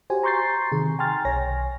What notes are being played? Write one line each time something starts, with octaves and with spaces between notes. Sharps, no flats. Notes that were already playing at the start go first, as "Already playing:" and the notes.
F#4 G4 C5 G#5
A#5 C6 C#6 G6 A6 C7
C3 D#3 G#4
G5 G#5 A#5 C6 F6 A6
B1 C#5 G#5 A#6